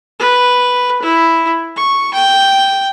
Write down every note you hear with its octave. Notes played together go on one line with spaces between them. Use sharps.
B4
E4
C#6
G5